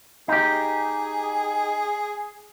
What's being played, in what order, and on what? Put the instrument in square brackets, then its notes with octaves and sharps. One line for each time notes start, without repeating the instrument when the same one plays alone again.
[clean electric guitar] D#4 G4 [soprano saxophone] G#4